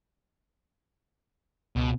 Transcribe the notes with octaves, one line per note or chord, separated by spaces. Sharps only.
C#2 B2